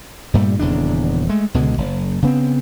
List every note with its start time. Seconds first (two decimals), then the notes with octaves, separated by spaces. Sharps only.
0.34 G2 A#2 G3 A3
0.59 D#1 E2 C#3 D4
1.29 G#3 A3
1.54 C#2 B2 D3 G#3
1.78 F#1
2.22 C#3 B3 C4